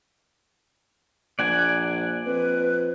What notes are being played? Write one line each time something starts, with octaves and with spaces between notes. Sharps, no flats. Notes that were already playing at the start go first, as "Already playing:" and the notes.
A#1 D5 F#5 G#5
F2 B4